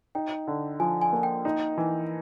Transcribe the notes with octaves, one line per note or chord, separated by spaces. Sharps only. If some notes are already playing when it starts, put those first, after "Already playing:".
D#4 G5
D3
F3 G#5
G#5
A#3
G5
D#4
E3